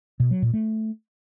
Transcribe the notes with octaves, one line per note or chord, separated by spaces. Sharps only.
B2
F#3
A#2
A3